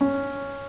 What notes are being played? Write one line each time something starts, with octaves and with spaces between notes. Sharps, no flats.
C#4